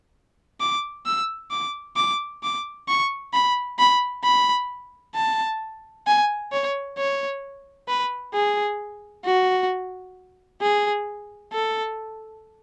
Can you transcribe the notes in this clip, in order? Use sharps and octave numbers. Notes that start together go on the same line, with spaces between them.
D6
E6
D6
D6
D6
C#6
B5
B5
B5
A5
G#5
C#5
C#5
B4
G#4
F#4
G#4
A4